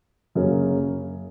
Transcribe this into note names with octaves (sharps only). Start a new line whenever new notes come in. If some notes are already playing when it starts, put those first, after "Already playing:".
F#2 C#3 F#3 A#3